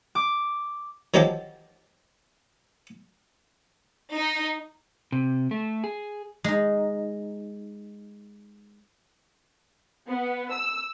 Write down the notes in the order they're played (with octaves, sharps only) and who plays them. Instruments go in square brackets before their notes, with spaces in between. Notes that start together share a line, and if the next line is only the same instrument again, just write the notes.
[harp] D6
[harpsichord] D#3 F3 F#3 G#3 G4 A4
[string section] D#4
[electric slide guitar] C3
A3
G#4
[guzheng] G#3 D#4
[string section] B3
E6